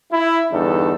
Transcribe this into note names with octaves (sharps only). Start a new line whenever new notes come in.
E4
E2 G2 D3 D#4 A4